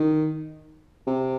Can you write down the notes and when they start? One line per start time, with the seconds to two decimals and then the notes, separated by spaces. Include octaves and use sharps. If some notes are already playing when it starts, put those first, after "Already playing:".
Already playing: D#3
1.07 C3